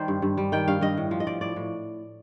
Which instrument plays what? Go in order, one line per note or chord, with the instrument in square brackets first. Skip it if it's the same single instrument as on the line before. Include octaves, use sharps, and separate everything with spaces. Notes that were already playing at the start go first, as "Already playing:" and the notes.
Already playing: [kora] D#3 G3 C5
G2
G2
G3
D#3 G5
G2 F5
G2 D#5
A2
F3
D#5
F3 D5
A2 D5
A2